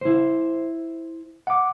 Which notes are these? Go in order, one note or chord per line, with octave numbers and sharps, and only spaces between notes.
E4 C5
F#5 D6